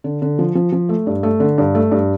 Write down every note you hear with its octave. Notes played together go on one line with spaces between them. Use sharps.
D3
D3
F3
F3
F3
A3
G2
A3
D3
G2
A3
G2